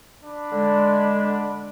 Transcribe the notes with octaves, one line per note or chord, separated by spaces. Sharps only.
D4 B5
D3 G#3